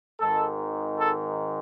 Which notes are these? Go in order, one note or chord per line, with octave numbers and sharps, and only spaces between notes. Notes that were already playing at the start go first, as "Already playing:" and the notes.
G#1 G#2 D#3 A4
A4